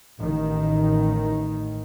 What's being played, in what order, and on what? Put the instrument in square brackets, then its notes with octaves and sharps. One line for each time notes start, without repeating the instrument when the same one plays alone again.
[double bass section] A1 D#3